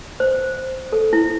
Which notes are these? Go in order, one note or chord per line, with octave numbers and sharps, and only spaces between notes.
C5
A4
E4